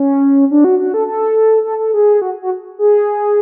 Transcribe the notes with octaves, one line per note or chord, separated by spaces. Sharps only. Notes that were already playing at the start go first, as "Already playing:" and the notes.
Already playing: C#4
D4
F#4
F#4
A4
A4
A4
A4
G#4
F#4
F#4
G#4